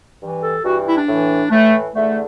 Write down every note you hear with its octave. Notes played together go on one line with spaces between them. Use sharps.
G2 E3
A4
G2 E3 F#4
E4
D4
A2 E3
A2 E3 A3
E2 D3 A3